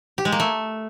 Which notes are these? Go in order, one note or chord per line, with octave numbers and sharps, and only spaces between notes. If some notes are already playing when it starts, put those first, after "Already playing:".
G4
G#3
A#3
A3